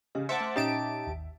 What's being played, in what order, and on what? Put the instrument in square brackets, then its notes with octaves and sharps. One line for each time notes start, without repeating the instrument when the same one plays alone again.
[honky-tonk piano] C#3 [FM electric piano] G4 D#5
[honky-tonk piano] C5 F#5 [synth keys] E5 A5 D6 [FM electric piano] C#7
[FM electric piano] A3 F6
[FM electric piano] A#2 C#4 [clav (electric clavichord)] D#4 [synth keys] G4 A5 D7 [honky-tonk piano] E5
[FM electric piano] G#1 D#2